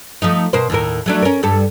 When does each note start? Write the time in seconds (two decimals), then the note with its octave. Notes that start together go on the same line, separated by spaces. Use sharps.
0.22 F3 A3 D#4
0.53 B2 A#4 C5
0.70 D#2 A2 A#4
1.06 F#3 A3 D4
1.22 C#4 A#4
1.43 G2 G3 A4